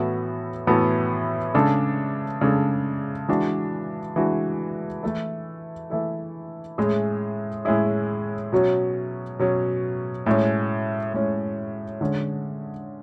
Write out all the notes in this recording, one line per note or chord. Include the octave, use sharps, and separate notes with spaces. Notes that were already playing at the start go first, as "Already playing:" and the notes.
Already playing: A2 E3 B3 F#4 A4
A2 E3 B3 F#4 A4
C#3 G#3 D4 A4
C#3 G#3 D4 A4
E3 G#3 D4 F#4
E3 G#3 D4 F#4
E3 A3 E4 A4
E3 A3 E4 A4
A2 G#3 C#4 E4 G#4
A2 G#3 C#4 E4 G#4
B2 F#3 C#4
B2 F#3 C#4
A2 G#3 C#4
A2 G#3 C#4
D3 G#3 C#4